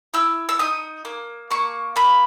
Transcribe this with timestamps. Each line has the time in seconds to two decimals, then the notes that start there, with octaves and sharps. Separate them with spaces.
0.14 E4 E6
0.49 E6
0.59 D#4 D#6
1.05 A#3
1.51 A#3 C#6
1.96 A#3 B5